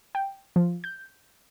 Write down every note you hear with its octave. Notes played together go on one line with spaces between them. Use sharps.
G5
F3
G6